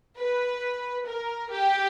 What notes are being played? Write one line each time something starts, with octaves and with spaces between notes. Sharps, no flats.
B4
A#4
G4